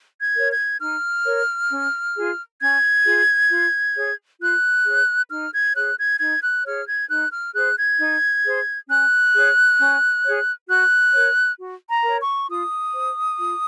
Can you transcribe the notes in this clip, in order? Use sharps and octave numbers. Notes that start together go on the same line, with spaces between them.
G#6
A#4 C#5
G#6
D#4 F6
A#4 C#5
C#4
F4 G#4
C#4 G#6
F4 G#4
F4
G#4 C#5
F4 F#6
G#4 C#5
D#4 F6
G#6
G#4 C#5 F#6
G#6
D#4 G#6
F#6
G#4 C#5 F6
G#6
D#4 F#6
F6
G#4 C5 F#6
G#6
D#4
G#4 C5
C#4 F#6
G#4 C#5
C#4
G#4 C#5
F#4 F#6
A#4 C#5
F#4
A#5
A#4 C#5
C#6
F4 D#6
C5
F4